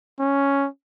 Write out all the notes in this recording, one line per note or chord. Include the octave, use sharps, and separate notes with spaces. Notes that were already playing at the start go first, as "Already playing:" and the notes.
C#4